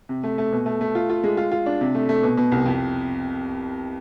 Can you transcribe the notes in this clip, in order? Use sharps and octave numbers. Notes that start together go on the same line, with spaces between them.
C3
A3
A3
B2
A3
A3
F4
F4
G#3
F4
F4
D4
C3
A3
A3
B2
B2
C2
F2